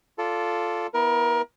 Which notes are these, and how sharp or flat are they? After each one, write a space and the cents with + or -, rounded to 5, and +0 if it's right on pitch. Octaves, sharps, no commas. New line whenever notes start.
F4 +0 A4 +0 D5 -15
B3 +0 E4 +0 A#4 +25